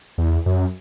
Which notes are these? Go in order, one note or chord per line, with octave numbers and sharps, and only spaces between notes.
E2
F#2